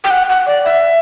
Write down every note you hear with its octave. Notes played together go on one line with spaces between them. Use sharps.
G5
F#5
F#5
D5
E5